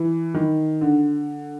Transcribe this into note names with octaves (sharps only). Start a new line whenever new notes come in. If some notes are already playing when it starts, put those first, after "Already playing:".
Already playing: E3
D#3
D3